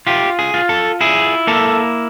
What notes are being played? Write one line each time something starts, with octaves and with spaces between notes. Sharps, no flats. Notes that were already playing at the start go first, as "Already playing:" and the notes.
F4 G4
G#4
F4
A4
E4 G#4
A#3 A4